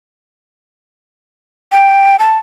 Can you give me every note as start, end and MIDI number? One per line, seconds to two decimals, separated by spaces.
1.72 2.16 79
2.19 2.37 81